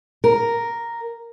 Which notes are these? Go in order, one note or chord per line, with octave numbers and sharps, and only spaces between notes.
A#4